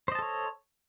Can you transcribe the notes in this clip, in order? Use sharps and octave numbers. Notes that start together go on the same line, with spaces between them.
A4 C5 C#5 D#5 A5